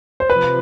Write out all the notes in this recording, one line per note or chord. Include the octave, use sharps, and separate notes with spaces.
C5
C3 F3 B4